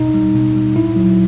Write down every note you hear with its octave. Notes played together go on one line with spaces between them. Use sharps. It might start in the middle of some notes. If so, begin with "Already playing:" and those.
Already playing: B2 D#4
G3
B2
G3
A#2 E4
F#3